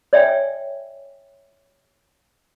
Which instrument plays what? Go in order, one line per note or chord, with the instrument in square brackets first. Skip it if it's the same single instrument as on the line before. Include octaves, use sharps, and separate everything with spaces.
[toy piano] C#5 D5 E5 G5 G#5